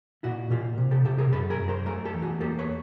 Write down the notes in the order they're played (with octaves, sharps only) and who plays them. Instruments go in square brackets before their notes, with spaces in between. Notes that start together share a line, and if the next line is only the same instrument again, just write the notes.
[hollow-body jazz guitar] A#2 E4 F#4
A#2 F4 G4
C3
G4 A4
C3 G4 A4
G#4 A#4
F#2 A4 B4
G#4 A#4
F#2
A#4 C5
A3 G#4 A#4
G4 A4
E2
F#4 G#4
A#3 G4 A4
B4 C#5